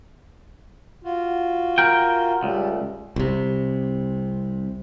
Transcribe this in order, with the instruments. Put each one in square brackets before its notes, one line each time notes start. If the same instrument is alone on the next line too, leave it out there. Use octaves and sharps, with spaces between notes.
[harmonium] F4 F#4
[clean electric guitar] A#4 G5
[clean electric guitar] C#2 [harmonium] G3 A3
[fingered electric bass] C2 C3